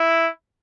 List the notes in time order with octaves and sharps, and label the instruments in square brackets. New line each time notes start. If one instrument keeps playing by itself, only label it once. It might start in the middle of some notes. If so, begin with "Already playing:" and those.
Already playing: [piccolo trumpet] E4